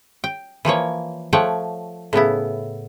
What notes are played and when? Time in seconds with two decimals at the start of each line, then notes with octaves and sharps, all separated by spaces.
0.24 G5
0.65 E3 F3 A#3 C#5
1.33 F3 A3 C#5 F#5 G5
2.13 A2 C#3 B3 E4